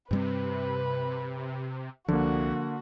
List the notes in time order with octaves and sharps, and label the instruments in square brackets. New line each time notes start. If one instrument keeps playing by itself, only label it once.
[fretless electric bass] G2 G3 C4 [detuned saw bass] C3 [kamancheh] B4
[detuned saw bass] C2 [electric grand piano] D3 A#3 [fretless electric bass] F3 [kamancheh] F#4